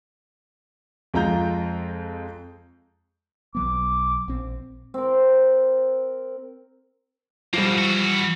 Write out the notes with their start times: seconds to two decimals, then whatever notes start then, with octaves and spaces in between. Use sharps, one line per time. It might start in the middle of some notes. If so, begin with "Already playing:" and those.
1.14 F2 G#3 F4 A#5 G6
3.55 B1 F#3 B3 D6
4.28 A#1 C4
4.94 C4 A#4
7.53 B2 F3 G3 A#3
7.78 E3 F#4